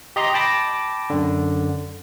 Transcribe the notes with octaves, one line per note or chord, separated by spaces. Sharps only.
G4 D#5 A#5 C6
G5 A5 B5 D6 A#6
F#2 D3